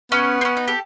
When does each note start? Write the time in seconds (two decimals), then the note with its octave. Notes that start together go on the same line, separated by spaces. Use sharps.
0.12 B3 C#4
0.41 C4
0.45 C#4
0.57 D#4
0.68 G4 A4